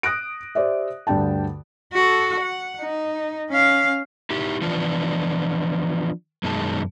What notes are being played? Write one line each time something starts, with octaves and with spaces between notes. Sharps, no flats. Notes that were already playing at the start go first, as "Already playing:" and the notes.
D#6 F#6 A#6 D7
G4 C5 D5 E5
D2 G2 D3 G5 A5
F#4 A4
F#5
D#4
C#4 F5
D#4 E4 G4
E3 F3 B3 D4 F4
F#2 B2 D#3 G#3 A5